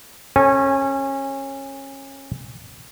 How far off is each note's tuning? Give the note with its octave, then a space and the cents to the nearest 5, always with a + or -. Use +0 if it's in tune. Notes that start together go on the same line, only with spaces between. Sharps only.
C#4 -25 A4 +5 G#5 -5